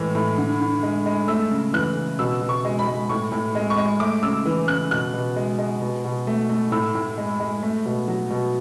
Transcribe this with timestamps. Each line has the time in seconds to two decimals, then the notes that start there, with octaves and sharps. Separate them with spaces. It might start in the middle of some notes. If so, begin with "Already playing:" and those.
Already playing: A2 E3 G#3
0.15 A2
0.38 D3
0.61 D3
0.83 G#3
1.06 G#3
1.28 A3 E6
1.51 C#3
1.74 E3 F#6
1.97 C#3
2.19 B2 E6
2.42 B2
2.49 C#6
2.65 G#3
2.79 B5
2.87 G#3
3.09 A2 C#6
3.32 A2
3.55 G#3
3.70 C#6
3.77 G#3
4.00 A3 D6
4.23 C#3 E6
4.46 E3
4.68 C#3 F#6
4.91 B2 F#6
5.14 B2
5.36 G#3
5.59 G#3
5.82 B2
6.05 B2
6.27 A3
6.49 A3
6.72 A2 E6
6.95 A2
7.18 G#3
7.40 G#3
7.63 A3
7.86 B2
8.08 F#3
8.30 B2